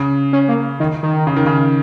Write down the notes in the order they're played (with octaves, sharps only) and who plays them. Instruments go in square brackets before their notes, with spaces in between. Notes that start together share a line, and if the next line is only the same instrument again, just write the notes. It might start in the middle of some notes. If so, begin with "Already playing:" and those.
Already playing: [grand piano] C#3
[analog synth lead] C#4
A#3
D#3
D#3
[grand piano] C#3
D#3
C#3